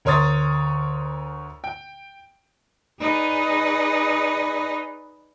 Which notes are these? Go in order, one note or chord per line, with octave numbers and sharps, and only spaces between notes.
D2 A#4 C#5 C6 D#6 A6
G5
D#4 G#4 B4 D5 D#5